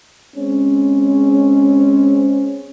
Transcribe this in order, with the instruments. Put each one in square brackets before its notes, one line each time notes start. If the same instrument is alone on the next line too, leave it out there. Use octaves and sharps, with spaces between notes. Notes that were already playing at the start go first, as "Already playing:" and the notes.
[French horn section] G#3 C4 C#4